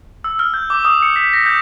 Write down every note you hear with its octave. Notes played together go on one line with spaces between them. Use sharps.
E6
F6
G6
D6
D#6
C#7
B6
A#6
G6